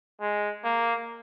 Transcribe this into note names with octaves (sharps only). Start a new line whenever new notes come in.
G#3
A#3